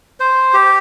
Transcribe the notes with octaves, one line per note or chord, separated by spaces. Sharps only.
C5
G4